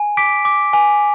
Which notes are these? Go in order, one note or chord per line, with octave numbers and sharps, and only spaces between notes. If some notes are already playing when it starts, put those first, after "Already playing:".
Already playing: G#5
D6 B6 D7
D6
G#5